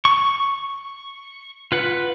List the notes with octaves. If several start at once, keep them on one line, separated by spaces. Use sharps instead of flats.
C#6
F4 B4 F#5